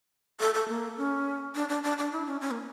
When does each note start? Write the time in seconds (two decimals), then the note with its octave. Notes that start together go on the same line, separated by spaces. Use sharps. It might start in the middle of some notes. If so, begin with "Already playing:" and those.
0.40 A4
0.54 A4
0.68 A#3
0.97 C#4
1.55 D4
1.69 D4
1.83 D4
1.98 D4
2.12 E4
2.27 C#4
2.41 C#4
2.51 A#3